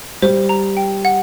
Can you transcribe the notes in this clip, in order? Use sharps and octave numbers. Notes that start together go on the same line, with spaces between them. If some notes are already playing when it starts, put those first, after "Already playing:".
G3 C5
A#5
G5
F#5